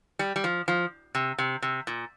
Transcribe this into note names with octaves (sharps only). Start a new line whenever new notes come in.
G3
G3
F3
F3
C3
C3
C3
A#2